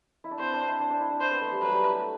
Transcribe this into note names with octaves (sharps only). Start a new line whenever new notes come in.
E4
D4
C4 C5
D4
E4
D4
D4
E4
D4
E4 C5
B3
A3
G3
F#3 B4
G3
A3
A3